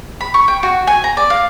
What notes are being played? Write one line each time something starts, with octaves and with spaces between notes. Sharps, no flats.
B5
C#6
G5
F#4
G#5
A#5
D5
F5